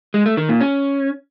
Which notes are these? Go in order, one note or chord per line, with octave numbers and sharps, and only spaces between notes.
G#3
A3
D#3
A#2
C#4